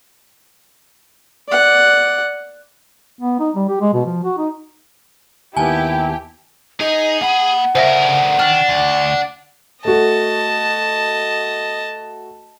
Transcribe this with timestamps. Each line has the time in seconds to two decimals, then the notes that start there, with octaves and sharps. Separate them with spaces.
1.49 D5 F#5
3.21 B3
3.40 D#4
3.56 G3
3.68 G4
3.81 G#3
3.94 B2
4.06 F3
4.24 F#4
4.38 D#4
5.57 D#2 D#3 B3 E4 G4 G#5 A5
6.80 D#4 G#4 D#5
7.21 A#3 F#5 B5
7.75 D2 C#3 A#4 C5 E5 A#6
8.39 D#3 D4 F6
8.69 D2
9.85 A3 F#4 D#5 A5